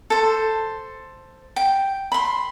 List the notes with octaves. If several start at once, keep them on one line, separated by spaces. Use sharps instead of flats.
A4 C5
G5
B5 C6